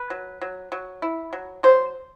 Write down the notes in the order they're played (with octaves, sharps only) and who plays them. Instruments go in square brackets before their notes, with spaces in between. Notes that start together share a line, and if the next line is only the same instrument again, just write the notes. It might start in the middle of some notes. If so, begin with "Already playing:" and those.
Already playing: [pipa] B4
F#3
F#3
F#3
E4
F#3
F#3 C5